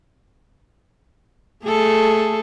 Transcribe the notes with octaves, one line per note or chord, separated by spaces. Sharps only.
A3 G#4 A4